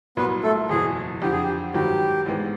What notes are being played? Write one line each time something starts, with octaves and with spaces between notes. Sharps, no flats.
C2 A#2 F#3 B3 B4
A3 A4
F#1 E2 B2 G#4
F2 D3 F3 G4
G#4
G4
G#1 G2 D#3 F#3 G4
A1 G#2 E3 G#3 B3